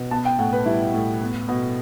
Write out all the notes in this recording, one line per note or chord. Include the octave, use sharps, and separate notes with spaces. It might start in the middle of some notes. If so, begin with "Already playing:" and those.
Already playing: B2
B3 A5
G5
A2 F#5
B4
G3 E4
A2
B3
B2